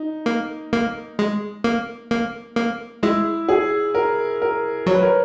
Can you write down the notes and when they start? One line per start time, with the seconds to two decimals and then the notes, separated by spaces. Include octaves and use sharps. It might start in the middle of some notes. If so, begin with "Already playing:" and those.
Already playing: D#4
0.26 A#3
0.73 A#3
1.19 G#3
1.64 A#3
2.11 A#3
2.56 A#3
3.03 G#3 E4
3.49 G#4
3.95 A#4
4.42 A#4
4.86 F#3 C#5
4.94 B4
5.03 A#4